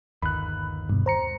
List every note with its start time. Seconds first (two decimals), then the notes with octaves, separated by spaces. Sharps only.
0.22 G1 D#2 B5 F#6
0.90 G2 B2
1.06 C5 A#5 C#7